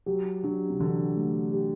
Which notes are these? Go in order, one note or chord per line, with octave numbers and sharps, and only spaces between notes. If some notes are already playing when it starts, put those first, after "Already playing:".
F#3 G4
F#3 D4
C3
D3 E3
A3
G4